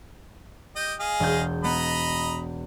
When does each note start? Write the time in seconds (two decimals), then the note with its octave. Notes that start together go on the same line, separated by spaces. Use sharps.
0.76 G4 D#5 G5
1.00 G#4 D#5 F5
1.20 E1 G6
1.64 B3 D#5 A#5 B5